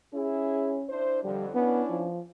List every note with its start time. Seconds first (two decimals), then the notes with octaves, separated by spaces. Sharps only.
0.13 C#4 E4 G#4
0.89 D4 E4 C5
1.24 F2 D3 G3
1.54 B3 C#4 D4 E4
1.90 F3